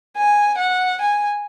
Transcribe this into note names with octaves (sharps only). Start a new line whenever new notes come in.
G#5
F#5
G#5